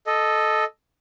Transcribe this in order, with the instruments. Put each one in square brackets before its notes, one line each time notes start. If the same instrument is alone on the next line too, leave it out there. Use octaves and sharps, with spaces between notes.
[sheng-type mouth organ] A4 D#5